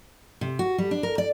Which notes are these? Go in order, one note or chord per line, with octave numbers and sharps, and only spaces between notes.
C3
F#4
G3
D4
A#4
D5